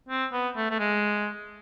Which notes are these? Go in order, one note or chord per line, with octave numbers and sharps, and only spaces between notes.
C4
B3
A3
A3
G#3